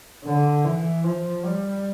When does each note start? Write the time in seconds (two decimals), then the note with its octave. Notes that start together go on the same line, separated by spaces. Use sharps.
0.24 D3
0.64 E3
1.04 F3
1.44 G3